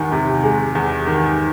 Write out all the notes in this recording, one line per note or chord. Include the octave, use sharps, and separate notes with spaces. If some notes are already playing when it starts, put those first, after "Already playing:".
Already playing: E2 C3 D#3
C3
G#3
E2
D#3